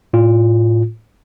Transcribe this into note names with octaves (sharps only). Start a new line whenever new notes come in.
A2 F4